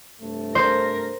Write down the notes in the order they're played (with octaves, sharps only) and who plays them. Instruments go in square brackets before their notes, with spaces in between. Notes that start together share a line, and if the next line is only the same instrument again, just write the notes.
[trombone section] G2 C3 A3
[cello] A#4 [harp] C5